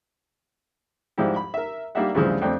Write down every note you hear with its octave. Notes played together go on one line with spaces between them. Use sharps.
G#2 F3 G3 E4 G4
B5
A#4 E5
G3 A#3 D4 D#4 E5 F#5
D2 G2 C#3 E3 F3 G3
F2 A3 C4 D4